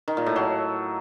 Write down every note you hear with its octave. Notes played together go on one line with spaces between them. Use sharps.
D#3
A#2
A2
F#3